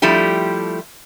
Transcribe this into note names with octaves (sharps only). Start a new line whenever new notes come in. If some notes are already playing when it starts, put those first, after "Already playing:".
F3 G3 A3 E4 G4